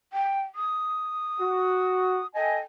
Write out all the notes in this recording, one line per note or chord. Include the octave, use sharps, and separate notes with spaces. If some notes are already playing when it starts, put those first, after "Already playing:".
G5
D#6
F#4
A4 D#5 G5 G#5